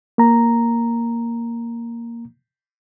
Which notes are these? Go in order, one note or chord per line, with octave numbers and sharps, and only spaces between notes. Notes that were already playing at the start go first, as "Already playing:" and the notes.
A#3 A#5